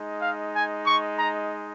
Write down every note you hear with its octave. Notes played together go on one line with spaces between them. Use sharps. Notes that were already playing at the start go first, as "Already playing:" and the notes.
Already playing: G#3 D#4
F5
G#5
C#6
A#5